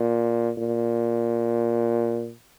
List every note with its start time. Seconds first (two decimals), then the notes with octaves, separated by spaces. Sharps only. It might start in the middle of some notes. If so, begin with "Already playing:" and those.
Already playing: A#2
0.58 A#2